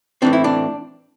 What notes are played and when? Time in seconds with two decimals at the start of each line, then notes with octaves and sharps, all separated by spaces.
0.22 A2 E3 C4 D4
0.33 E4
0.44 D4